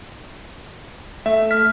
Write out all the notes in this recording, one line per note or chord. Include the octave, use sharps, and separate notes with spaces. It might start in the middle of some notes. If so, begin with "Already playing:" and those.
A3 E5
F6 B6